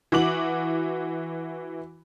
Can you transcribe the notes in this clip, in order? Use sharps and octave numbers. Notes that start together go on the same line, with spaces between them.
E3 F#4 D6 F#7